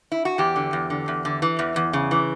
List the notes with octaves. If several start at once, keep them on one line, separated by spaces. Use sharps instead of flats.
E4
F#4
E2 G4
D3
E2
D3
E2
D3
E3
E2
E2
C#3
E3